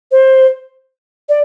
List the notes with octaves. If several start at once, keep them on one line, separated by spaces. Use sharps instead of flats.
C5
D5